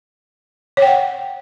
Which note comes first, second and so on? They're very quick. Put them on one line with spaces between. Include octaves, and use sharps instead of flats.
C#5 G5 F#5